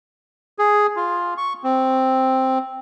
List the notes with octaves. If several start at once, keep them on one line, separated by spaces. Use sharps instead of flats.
G#4
F4
C#6
C4